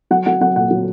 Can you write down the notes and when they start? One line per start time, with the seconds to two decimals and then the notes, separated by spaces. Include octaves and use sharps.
0.11 F#3 F#5
0.26 F#3 F#5
0.41 F#3 F#5
0.56 A#2 F#5
0.71 F#3